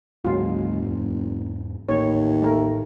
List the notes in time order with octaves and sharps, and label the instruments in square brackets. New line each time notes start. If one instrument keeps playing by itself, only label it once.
[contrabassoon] F#1 [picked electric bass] D2 G#2 G#3 [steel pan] F#3 F4
[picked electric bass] E2 G#2
[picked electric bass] A1 A2 [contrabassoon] D#2 [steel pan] C#5
[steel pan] A3 A#4